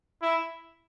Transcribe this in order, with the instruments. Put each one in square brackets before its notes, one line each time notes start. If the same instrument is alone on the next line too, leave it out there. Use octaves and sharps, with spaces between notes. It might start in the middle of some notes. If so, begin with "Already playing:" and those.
[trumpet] E4